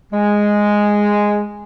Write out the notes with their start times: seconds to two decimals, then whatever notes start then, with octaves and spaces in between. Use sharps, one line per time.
0.12 G#3